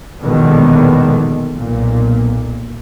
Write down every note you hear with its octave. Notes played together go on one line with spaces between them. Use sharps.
A#1 E2 B2 D3 D#3 G#3
B1 A#2